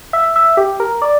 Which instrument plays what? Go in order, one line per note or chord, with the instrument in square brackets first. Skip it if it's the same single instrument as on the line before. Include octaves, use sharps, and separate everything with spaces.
[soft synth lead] E5
E5
G4
A#4
D5